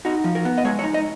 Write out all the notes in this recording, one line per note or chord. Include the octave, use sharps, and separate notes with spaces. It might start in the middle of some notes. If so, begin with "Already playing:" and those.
D#4 F#4
F3
A#4
B3
D#5
G#3 C#5
C#5
D#4
D#5